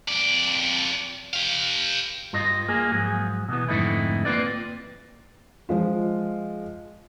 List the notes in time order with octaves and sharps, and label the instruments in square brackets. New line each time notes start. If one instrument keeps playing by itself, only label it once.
[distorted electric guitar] F2 D5
G4 F5
[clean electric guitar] G2 F4 D#5
A#3 G#4
G#2 F3 F#3 G#4
B2 E3 F#3 B3
F2 G#2 D3 A3 D#4 E4
A#3 C4 F4 B4 D5
[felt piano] F3 G#3 F4